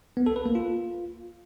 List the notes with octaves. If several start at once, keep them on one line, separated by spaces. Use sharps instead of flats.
B3
A4
B4
A#3
F4